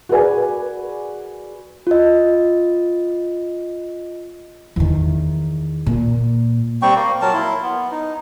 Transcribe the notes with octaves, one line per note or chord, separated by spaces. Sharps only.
F#4 G#4 A#4 B4 D5 G#5
F4 D#5
E2 D#3
A#2
G3 C4 G5 C#6
A#3
F#3 A#4 A5
E4 C6
B3
D#4